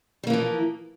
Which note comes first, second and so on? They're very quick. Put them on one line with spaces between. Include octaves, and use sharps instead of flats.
G3 A#3 E3 F3